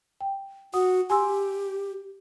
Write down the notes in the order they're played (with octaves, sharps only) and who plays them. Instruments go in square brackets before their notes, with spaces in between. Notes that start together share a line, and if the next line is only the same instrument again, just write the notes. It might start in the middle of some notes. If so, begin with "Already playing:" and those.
[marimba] G5
[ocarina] F#4 [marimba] F#5 D#6
[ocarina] G4 [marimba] G#5 C6 E6